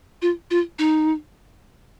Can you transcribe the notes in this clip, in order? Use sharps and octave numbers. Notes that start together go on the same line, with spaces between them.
F4
F4
D#4